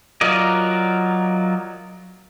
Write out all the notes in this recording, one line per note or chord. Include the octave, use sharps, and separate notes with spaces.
F#3 F4 A#4 D5 D#5